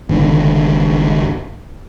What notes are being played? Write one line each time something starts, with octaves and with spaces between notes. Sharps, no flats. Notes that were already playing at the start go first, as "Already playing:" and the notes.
G1 C#2 D3 D#3